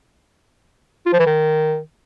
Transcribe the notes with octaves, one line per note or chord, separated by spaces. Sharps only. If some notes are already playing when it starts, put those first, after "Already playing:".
F4
F3
E3
D#3